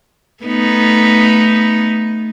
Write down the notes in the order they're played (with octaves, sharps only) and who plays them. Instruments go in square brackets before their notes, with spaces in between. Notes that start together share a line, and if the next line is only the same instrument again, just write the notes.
[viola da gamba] A3 B3 D#4